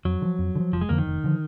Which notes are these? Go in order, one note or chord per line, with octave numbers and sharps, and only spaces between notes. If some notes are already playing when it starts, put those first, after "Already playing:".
F2 F#3
D3
F3
F2
D3
F3
F1 F3
G#3
F2 D3 F3 A#3
D#3
F1
D3 F3